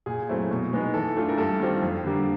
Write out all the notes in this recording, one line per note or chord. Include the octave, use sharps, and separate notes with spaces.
A#2 G#4
F#3 A3 C4 E4
B2
G#3 B3 D#4
E3 A4
A3 D4 F4
A#4
G2 A4
D#3 G3 C4 F4
F2
D3 G3 A#3